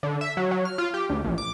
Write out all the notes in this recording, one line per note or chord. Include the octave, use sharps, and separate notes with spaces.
D3
E5
F#3
F#3
F6
F4
G4
D2
A#1
D6